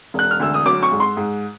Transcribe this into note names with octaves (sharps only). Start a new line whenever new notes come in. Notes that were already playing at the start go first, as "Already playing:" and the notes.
E1 F#6
F6
D2 E6
D#6
F#3 D6
C#6
G#2
C6
G#2